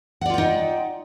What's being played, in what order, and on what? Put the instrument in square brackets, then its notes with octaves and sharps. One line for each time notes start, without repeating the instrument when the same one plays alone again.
[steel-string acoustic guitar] F#5
D5
F4
G5
D#4